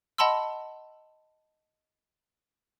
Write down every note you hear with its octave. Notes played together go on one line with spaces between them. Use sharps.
D#5 F#5 A5 B5 C6 E6